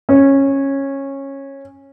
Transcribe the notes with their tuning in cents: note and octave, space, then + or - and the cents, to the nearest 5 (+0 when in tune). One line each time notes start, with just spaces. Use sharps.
C#4 -15